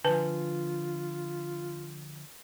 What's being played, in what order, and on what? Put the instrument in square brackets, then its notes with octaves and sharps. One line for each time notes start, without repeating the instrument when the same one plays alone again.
[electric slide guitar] D3 F3 [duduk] F4 [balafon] B4 G#5 A5